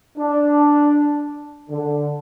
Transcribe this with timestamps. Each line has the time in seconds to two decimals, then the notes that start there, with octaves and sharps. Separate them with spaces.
0.17 D4
1.68 D3